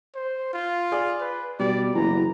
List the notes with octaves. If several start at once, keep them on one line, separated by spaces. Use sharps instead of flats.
C5
F4
G#4 D5
B4
B2 G3 D5
F#1 E3 A#5